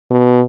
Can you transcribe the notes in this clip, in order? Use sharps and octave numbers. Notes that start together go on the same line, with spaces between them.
B2